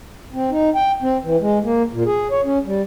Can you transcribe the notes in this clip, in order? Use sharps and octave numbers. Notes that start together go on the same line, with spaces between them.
C4
D#4
G5
C4
E3
G#3
A#3
A#2
G#4
C#5
C#4
G3